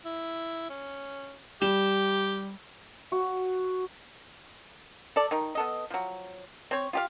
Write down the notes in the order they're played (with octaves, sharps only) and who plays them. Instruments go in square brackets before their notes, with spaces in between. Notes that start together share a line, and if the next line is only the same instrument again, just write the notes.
[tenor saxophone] E4
C#4
[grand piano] G3 E7 [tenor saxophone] G4
[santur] F#4
[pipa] A4 D5
D#3 D#4
B3 A4 D#5
F3 F#3
C4 C#5
F4 G4 F5